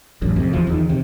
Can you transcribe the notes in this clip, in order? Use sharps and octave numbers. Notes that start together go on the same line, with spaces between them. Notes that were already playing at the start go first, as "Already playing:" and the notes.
A1 F#2
F2 C3
F1 E2 F3
E2 D#3
C3